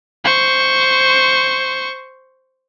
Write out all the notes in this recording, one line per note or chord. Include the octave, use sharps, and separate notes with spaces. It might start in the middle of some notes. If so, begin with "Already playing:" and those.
C5 C#6